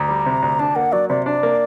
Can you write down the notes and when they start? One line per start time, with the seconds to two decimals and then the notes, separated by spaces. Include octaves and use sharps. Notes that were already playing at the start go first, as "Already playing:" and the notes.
Already playing: D2 A#5
0.09 G3
0.26 C3
0.42 D2
0.59 D4 A5
0.76 A#3 F#5
0.92 F#3 D5
1.10 C3 D5
1.26 D4 D5
1.43 A#3